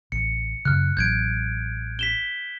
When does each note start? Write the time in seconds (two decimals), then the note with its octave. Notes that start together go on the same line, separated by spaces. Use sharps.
0.12 A1 C#7
0.65 F#2 C#3 F6 F#6
0.97 A1 F#3 G6 G#6 D7
1.99 B6 E7 G7